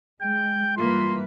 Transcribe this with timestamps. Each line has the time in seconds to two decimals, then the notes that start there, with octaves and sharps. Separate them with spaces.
0.21 G#3 G5 G6
0.77 G2 E3 A#3 F4 B4 C6